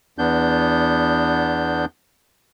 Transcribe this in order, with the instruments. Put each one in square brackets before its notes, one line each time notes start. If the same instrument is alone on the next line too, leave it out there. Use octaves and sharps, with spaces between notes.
[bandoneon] E2 B3 D4 G6